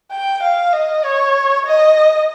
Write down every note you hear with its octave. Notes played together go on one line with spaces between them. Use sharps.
G5
F5
D#5
C#5
D#5